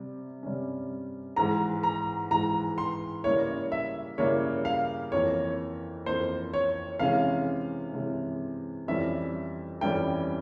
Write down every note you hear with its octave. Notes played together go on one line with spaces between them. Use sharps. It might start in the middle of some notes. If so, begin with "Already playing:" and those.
Already playing: C3 G3
C3 G3 C#4
G#2 E3 G#3 A#5
A#5
G#2 E3 G#3 A#5
C6
C#3 G3 A#3 E4 C#5
E5
C#3 G3 A#3 E4 C#5
F5
F2 E3 A#3 C#5
F2 E3 A#3 C5
C#5
C3 E3 G#3 C#4 F5
C3 E3 G#3 C#4
F2 E3 G3 C#4 E4 E5
F2 E3 G3 C#4 E4 G5